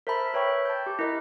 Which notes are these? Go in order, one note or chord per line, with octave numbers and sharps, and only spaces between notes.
A#4 C5 E5 A5 B5
B4 C#5 E5 G5 C#6
A5 G6
G4
E4 A#4 D#5